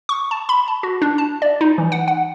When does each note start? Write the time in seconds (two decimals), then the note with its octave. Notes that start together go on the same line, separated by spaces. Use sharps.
0.09 C#6
0.31 A5
0.49 B5
0.68 A5
0.83 F#4
1.02 D4
1.18 A5
1.42 D5
1.61 D#4
1.78 E3
1.92 F#5
2.08 F#5